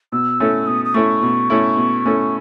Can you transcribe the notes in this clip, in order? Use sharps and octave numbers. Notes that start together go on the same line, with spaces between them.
B2 E6
A3 C#4 E4 A4
B2 D#6
D#6
A3 C#4 E4 A4 C#6
B2
A3 C#4 E4 A4
B2
A3 C#4 E4 A4